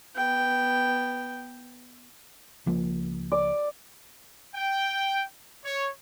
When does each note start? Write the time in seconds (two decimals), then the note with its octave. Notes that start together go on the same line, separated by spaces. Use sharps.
0.16 B3 G5
2.66 C#2 F3 A#3
3.32 D5
4.55 G5
5.64 C#5